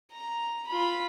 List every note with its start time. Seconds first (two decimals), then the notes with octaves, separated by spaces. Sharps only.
0.12 A#5
0.67 F4 B5